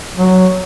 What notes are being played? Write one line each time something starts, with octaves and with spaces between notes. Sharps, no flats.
F#3